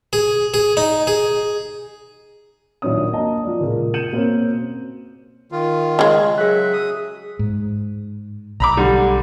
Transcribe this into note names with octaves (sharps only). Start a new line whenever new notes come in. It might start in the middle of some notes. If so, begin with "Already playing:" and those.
G#4
G#4
D#4
G#4
A#1 D#2 F#3 D4 C#5 D#6
A#3 D#5 A5 A#5
F3 D5
C#2 A#2 G#4
G6 C#7 D#7 E7 F#7
B2 A#3 C4 C#4
D#3 F4
C#3 G#3
F#3 G#4 E5 F#6
D#6
G#2
B1 A#5 B5 D6
D3 G3